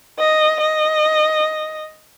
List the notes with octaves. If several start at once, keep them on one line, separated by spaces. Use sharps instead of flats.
D#5
D#5